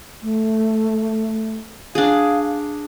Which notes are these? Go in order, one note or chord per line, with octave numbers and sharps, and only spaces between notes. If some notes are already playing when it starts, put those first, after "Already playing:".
A3
D4 G#4 F5